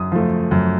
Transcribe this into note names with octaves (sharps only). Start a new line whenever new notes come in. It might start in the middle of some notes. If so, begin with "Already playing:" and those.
Already playing: F#2 D#6
F3 A3
F#2